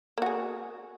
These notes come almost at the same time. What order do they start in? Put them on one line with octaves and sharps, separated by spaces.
A#3 F#4 G#4